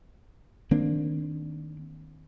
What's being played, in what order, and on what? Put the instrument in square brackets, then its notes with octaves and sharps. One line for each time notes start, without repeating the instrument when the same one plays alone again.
[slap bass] D#3 A#3 C4 D4